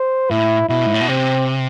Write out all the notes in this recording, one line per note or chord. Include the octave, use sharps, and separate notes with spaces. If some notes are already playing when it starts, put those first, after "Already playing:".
Already playing: C5
A2 E4
B2 E4
G#2
A2
B2
C3 C4